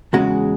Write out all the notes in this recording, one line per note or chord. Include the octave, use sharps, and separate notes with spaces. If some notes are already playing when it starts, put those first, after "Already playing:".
E2 C#3 G#3 F#4